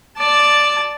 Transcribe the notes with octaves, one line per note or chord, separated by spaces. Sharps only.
D5 A5